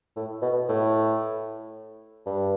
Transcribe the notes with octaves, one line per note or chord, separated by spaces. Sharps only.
A2
B2
A2
G2